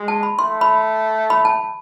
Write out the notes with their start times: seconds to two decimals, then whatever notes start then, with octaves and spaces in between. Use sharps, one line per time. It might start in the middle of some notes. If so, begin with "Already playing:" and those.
Already playing: G#3
0.08 A5
0.23 B5
0.39 A3 C6
0.61 B5
1.30 B5
1.45 A5